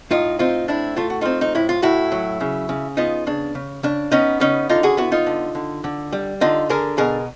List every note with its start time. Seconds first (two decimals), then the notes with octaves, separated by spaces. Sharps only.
0.11 A2 D#4 F4
0.39 C4 D#4 F4
0.68 A2 D4 E4
0.96 A3 F4
1.10 F#4
1.21 C4 D#4 F4
1.41 D#4
1.55 A2 E4
1.69 F4
1.82 A2 E4 F#4
2.12 F#3
2.41 C#3
2.69 C#3
2.97 B3 D#4 F4
3.27 C#3 D4
3.55 C#3
3.83 C#3 D4
4.11 B3 C#4 D#4
4.40 C#3 C#4 D#4
4.69 D3 D#4 F4
4.83 F#4 G#4
4.97 B3 E4 F#4
5.12 D#4 F4
5.26 D3
5.55 D3
5.84 D3
6.13 G3
6.41 D3 D#4 F4
6.69 D3 G#4 A#4
6.98 B2 G#4 A#4